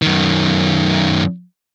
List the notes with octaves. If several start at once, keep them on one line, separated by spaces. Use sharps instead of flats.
F#2 D#3